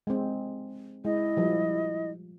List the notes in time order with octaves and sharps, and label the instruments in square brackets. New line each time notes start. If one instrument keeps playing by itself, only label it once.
[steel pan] G#3 C4
[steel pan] G#3 [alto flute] E4 [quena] D#5
[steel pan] F3 G3